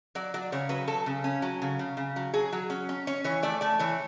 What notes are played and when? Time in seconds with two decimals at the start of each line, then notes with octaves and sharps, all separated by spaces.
0.15 F#3 D5
0.34 F#3 D5
0.52 C#3 C#5
0.69 F#3 B4
0.88 F#3 A4
1.06 C#3
1.24 C#4
1.42 F#3
1.62 C#3
1.79 C#3
1.97 C#3
2.16 F#3
2.34 F#3 G#4
2.53 F#3
2.70 C#4
2.89 C#4
3.07 C#4 C#5
3.24 E3 C#5
3.43 A3 D5
3.61 A3 D5
3.79 E3 C#5